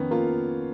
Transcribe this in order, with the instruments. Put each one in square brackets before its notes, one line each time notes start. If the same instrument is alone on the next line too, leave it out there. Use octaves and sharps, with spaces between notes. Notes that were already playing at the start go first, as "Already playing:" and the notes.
Already playing: [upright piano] F2 D#3 [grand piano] B3 C#4
[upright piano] A#3 [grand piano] F4